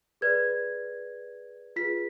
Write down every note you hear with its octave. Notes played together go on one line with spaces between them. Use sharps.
G#4 B4 D5 G#6
F4 G#4 B4 B6